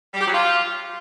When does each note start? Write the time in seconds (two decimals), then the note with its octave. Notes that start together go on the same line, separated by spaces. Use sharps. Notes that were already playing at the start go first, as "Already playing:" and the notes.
0.14 G3
0.21 G4
0.27 F#3
0.34 F4